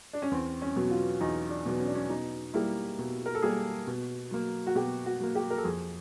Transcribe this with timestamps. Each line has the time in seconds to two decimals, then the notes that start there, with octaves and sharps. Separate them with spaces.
0.13 D4
0.22 C#4
0.31 E2 C4
0.62 C#4
0.76 B2 F#3 B3
0.91 F4
1.21 E2 D#4
1.50 D4
1.66 B2 F#3 B3
1.80 C#4
1.87 D4
1.95 C#4
2.10 B2 D#4
2.54 G3 A#3 E4
2.99 B2
3.26 A#4
3.35 A4
3.42 G3 A#3 G#4
3.87 B2
4.31 F#3 A#3
4.67 F#4
4.75 B2 G4
5.06 F#4
5.20 F#3 A#3
5.35 G4
5.51 A#4
5.58 A4
5.64 F2 G#4